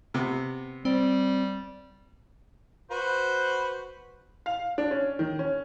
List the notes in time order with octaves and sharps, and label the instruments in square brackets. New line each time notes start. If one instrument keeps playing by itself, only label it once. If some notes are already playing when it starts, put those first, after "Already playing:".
[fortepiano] C3 B3
[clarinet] G3 [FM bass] C4
[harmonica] F#4 B4 C5
[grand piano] F5
D4
C#4
D#3
C#4